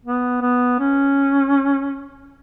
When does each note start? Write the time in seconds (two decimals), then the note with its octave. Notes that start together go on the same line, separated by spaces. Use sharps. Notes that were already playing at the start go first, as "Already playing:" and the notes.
0.05 B3
0.42 B3
0.79 C#4